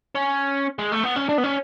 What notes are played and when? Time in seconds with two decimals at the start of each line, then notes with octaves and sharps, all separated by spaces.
0.15 C#4
0.79 G#3
0.92 A3
1.03 B3
1.16 C#4
1.29 D4
1.38 B3
1.44 C#4